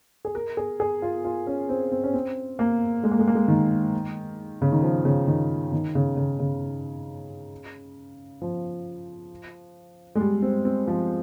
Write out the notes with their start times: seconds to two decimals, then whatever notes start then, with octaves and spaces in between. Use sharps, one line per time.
0.25 G#4
0.35 A#4
0.57 G#4
0.80 G#4
1.02 F4
1.25 F4
1.47 C#4
1.69 C4
1.92 C4
2.04 C#4
2.14 C4
2.59 A#3
3.04 G#3
3.11 A#3
3.19 G#3
3.28 A#3
3.35 G#3
3.48 D#3
4.62 C#3
4.72 D#3
4.83 F3
5.05 C#3
5.28 D#3
5.72 D#3
5.95 C#3
6.17 C#3
6.39 C#3
8.42 F3
10.15 G#3
10.20 G3
10.42 C4
10.65 C4
10.87 F3